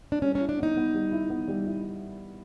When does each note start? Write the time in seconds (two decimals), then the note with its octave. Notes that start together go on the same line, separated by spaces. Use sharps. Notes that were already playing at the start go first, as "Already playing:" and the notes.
0.12 D4
0.22 G3 C#4
0.35 C#4
0.41 E4
0.49 D4
0.58 B3 D#4
0.77 B3
0.94 G3
1.12 E4
1.30 B3
1.48 G3
1.66 E4